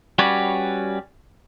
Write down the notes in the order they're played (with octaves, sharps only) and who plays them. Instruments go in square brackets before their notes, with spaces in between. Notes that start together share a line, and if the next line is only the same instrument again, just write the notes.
[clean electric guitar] G3 C#4 F#4 B4 C#5 D5